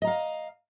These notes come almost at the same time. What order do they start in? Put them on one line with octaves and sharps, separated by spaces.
D#5 A#5 F5